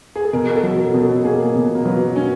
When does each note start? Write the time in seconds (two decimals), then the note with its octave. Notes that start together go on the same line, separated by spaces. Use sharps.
0.16 G#4
0.24 A4
0.33 B2 A#4
0.56 A4
0.63 F#3
0.79 A#4
0.94 B2
1.02 A4
1.25 A#3 G#4
1.55 B2
1.75 A#3
1.85 F#3 B3
2.16 C#4